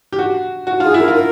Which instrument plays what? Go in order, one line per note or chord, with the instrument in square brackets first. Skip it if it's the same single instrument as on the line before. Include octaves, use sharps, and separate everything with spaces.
[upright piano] G4
F#4
F#4
[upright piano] F4 [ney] G#4
[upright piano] E4 [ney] A#4
[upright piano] F4
[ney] A#4